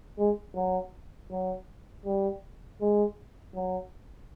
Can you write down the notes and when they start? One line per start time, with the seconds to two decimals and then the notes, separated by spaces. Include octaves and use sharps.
0.18 G#3
0.55 F#3
1.31 F#3
2.05 G3
2.81 G#3
3.55 F#3